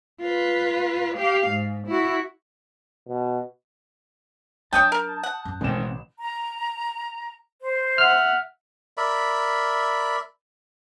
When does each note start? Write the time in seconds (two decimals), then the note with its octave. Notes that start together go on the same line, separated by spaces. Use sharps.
0.22 F4 B4
1.15 G4 F5
1.48 G#2
1.88 E4 F#4
3.08 B2
4.73 F#3 D4 C#5 D#5 G5 A5 D#6 G6
4.92 A#4
5.23 F#5
5.45 F#2
5.61 A1 B2 G#3 C4 E7
6.20 A#5
7.62 C5
7.98 E5 F#5 F6
8.97 A#4 D5 E5 B5